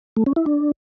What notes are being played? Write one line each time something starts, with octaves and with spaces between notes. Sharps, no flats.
A3
C#4
E4
D4